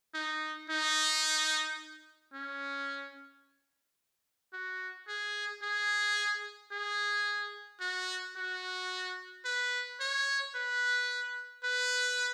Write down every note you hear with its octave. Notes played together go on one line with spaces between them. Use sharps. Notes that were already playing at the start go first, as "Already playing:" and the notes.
D#4
D#4
C#4
F#4
G#4
G#4
G#4
F#4
F#4
B4
C#5
B4
B4